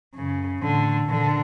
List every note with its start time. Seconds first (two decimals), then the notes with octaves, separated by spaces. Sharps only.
0.16 F#2 C#3
0.62 A2 D3
1.10 A#2 D3